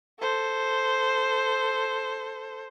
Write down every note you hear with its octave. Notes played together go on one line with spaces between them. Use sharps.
A4 C5